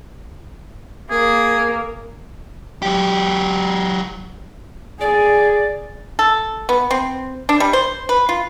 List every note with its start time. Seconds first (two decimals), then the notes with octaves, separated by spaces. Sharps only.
1.11 A#3 G#4
2.82 F#3 G4
5.01 G#4 D5
6.19 A4
6.69 B3
6.91 C4
7.49 D4
7.60 G3
7.73 C5
8.09 B4
8.29 F4